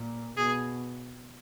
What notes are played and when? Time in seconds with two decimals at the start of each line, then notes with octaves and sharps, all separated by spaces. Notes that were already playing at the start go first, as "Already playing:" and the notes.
Already playing: A#2
0.37 B2 G#4